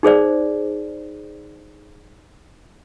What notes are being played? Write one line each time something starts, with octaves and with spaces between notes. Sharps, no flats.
D#4 G#4 C5 D5